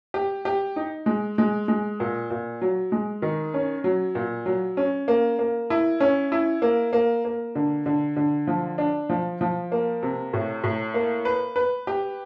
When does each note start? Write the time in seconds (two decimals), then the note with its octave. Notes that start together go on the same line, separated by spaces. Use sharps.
0.14 G4
0.45 G4
0.76 D#4
1.06 G#3
1.38 G#3
1.68 G#3
2.00 A#2
2.30 A#2
2.62 F#3
2.92 G#3
3.22 D#3
3.54 C#4
3.84 F#3
4.15 A#2
4.46 F#3
4.77 C#4
5.08 A#3
5.39 A#3
5.70 E4
6.00 C#4
6.32 E4
6.62 A#3
6.93 A#3
7.25 A#3
7.55 D3
7.86 D3
8.16 D3
8.47 F3
8.78 D4
9.10 F3
9.41 F3
9.72 A#3
10.03 C3
10.33 A2
10.64 A2
10.94 A#3
11.25 B4
11.56 B4
11.87 G4